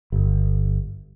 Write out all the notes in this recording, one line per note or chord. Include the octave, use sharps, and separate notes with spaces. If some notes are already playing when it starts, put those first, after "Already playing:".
G1